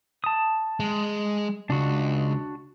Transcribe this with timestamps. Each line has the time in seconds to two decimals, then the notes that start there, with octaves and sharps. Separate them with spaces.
0.24 A5 D#6
0.80 G#3
1.70 C#2 D4 F#4